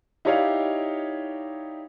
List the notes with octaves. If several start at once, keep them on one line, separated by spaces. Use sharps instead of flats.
D#4 E4 G4 C#5 D5 F5